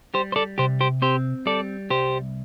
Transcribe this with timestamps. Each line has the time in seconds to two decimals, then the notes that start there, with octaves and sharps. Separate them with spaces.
0.14 G3 G4 C5
0.32 C5
0.36 A4 D5
0.58 C3 G4 C5
0.81 G4 C5
1.02 C4 G4 C5
1.46 G3 A4 D5
1.90 C2 G4 C5